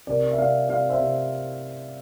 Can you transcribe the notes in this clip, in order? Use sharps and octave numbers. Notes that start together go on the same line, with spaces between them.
C3 A#4 D5
E5
C3 D5 F5
C3 D5 F5
C5 E5
C3